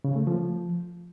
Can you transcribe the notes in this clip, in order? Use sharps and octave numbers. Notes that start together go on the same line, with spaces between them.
C#3
A3
F3